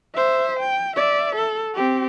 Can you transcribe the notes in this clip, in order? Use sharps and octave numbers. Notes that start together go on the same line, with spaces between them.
C5 E5
G5
D5 E5
A4
C4 G4